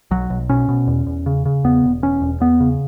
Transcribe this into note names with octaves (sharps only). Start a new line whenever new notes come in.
B1 F#3
B1
B2 C#4
B2
E2
E2
C#3
C#3
E2 B3
E1
E2 C#4
E1
E2 B3
C#3